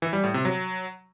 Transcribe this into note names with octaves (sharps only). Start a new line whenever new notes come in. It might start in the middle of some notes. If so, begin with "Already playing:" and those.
E3
G3
A2
C3
F#3